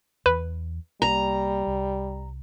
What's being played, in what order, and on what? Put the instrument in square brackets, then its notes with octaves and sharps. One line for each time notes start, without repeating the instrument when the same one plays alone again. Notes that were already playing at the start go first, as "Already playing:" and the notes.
[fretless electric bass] E2 E3 [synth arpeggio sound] B4
[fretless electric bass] C2 A#3 [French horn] G3 [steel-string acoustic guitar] A#5
[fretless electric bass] C2